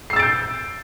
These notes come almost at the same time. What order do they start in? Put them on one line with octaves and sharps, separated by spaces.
C7 E6 A6 D7 G6